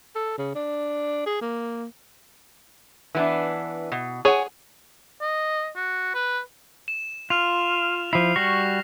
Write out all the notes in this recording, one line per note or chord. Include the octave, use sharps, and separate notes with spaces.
A4
C#3
D4
G#4
A#3
E3 B3 D4
B2
G#4 C#5 F#5 G#5
D#5
F#4
B4
E7
F4 F6 F7
F3 E4 C7
G3 F#4 C#6 A#6